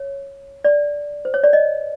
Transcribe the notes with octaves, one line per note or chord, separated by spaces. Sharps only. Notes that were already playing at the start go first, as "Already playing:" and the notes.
Already playing: C#5
D5
C5
C#5
D5
D#5